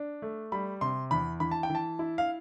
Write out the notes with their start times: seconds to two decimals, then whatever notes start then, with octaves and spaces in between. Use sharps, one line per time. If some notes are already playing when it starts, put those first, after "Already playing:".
Already playing: D4
0.22 A3
0.52 G3 B5
0.81 C3 C6
1.11 E2 B5
1.40 E3 B5
1.51 A5
1.63 G5
1.70 E3
1.75 A5
1.99 E4
2.18 F5